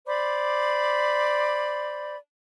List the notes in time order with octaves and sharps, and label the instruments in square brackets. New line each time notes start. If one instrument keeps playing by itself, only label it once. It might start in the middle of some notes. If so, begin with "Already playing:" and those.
[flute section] C5 D5 B5 D6